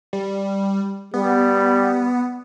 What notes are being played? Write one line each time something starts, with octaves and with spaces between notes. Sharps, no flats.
G3
G3 B3